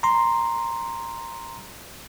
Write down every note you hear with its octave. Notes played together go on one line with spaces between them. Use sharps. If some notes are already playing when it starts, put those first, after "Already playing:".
A#5 C6